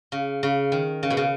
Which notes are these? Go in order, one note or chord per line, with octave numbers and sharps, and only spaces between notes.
C#3
C#3
D#3
C#3
B2
C#3